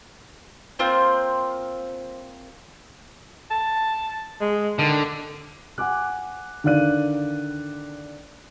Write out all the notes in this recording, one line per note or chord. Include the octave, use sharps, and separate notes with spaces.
A#3 C4 F4 C5
A5
G#3
D3 D#3
F#5 G#5 D6 F#6
D3 D#3 D5 F5 F#6 D#7